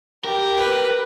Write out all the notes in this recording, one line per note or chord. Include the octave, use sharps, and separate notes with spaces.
G4 A#4
B4